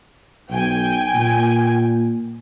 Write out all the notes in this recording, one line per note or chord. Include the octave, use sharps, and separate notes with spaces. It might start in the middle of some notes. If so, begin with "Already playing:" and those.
B1 G5 G#5
A#2